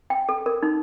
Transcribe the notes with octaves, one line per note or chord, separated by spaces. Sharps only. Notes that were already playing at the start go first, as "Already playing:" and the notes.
G5
A4
A#4
D#4